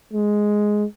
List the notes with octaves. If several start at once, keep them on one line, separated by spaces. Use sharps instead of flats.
G#3